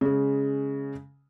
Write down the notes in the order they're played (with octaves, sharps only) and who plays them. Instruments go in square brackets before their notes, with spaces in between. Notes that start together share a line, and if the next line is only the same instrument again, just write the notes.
[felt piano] C#3 G#3